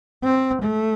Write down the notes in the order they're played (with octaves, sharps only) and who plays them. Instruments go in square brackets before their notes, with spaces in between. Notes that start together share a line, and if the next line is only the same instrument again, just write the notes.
[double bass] C4
A3